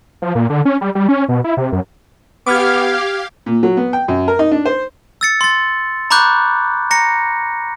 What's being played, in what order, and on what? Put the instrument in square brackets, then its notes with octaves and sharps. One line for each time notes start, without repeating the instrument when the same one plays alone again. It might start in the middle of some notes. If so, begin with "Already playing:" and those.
[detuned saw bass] F3
A#2
D3
C#4
G3
G3
C#4
B2
E4
C3
F#2
[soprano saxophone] B3 [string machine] G4 F5 [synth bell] D6 F6 G#6
[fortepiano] A#2
F#3
B3
G5
F#2
A#4
D#4
D4
C5
[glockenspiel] E6 A6 C#7
C6 A6
A#5 B5 C#6 D6 F#6 G6
A#5 A#6 C#7